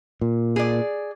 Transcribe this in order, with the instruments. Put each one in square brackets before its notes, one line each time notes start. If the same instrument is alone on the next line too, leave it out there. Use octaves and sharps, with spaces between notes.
[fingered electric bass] A#2
[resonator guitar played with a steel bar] G#4 D5